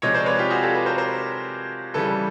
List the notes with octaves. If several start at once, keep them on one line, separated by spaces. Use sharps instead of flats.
C3 F3 G#3 C#5 D#5
C5 D5
B4 C#5
F4 G4
F#4 G#4
G4 A4
A4 B4
A#4 C5
A#4 C5
C#3 E3 G3 A4 B4